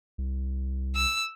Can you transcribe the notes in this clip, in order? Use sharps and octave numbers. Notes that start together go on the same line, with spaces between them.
C2
E6